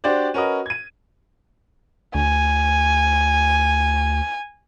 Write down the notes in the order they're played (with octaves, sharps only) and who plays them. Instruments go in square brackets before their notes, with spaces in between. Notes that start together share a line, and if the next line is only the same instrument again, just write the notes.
[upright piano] D4 F#4 G4 C5 D5
C#4 F#4 A#4 B4 D#5
G#6 D#7
[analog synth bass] D2 [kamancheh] G#5